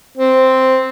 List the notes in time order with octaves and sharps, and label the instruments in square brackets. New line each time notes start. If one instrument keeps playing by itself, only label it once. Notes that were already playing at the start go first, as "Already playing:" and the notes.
[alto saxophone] C4